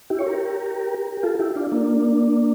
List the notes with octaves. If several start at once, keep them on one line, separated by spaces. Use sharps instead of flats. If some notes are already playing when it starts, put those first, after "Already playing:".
E4 G4
C#5
G4 A#4
G4
F4 A4
E4 G4
D4 F4
A#3 D4